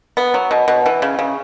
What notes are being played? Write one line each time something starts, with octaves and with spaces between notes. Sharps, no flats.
B3
F#3
B2
B2
E3
C#3
C#3